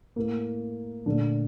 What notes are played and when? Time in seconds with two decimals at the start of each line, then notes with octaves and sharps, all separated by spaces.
0.16 A2 A3 A#3
1.06 A#2 D3 A3 D4